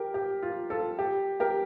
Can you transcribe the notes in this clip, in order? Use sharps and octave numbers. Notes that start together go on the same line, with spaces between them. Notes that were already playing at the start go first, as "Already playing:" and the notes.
Already playing: G4 A#4
G4
F4
F4 A4
G4
G4 A#4